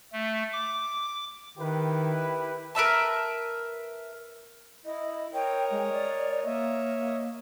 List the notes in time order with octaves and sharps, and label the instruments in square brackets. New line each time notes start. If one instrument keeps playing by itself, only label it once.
[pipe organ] A3
D6
[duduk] D#3 [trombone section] E4 G4 B4
[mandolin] A#4 B4 E5 A5
[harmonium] E4 [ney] D#5
[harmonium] A#4 C#5 D#5 [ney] G5
[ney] G#3
D5
[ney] A#3 [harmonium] C#5 D#5 E5